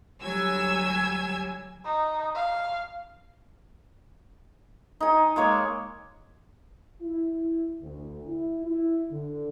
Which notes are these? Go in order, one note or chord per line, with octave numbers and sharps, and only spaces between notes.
D2 F#3 G3 G#5 E6 G#6
D#4
F5
D#4 G#5
G#3 A#3 C#5 D6
E4
D2
E4
E4
D3